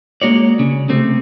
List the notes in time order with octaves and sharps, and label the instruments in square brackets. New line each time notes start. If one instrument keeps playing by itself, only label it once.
[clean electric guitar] G#3 A#3 F#4 C#5 D5
C#3
C3 A3 C4